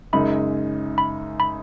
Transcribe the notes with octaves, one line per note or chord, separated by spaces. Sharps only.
F#2 C#3 G#3 D#4 B5
B5
B5